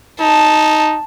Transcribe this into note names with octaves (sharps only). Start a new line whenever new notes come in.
D#4 A5